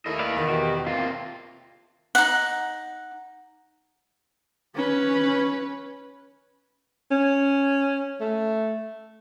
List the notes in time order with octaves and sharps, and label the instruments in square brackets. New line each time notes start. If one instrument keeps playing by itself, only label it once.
[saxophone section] D#2 A3 E4 [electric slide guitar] A#3 A#4 D#5
[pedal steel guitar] B4 D5 F5
[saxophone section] E2 D#3 [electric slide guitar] B2
[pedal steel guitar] F#4 G4
[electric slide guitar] C3 A#3 [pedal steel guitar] F4
[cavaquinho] D#4 F#5
[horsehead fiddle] C#4 B4
[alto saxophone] C#4
A3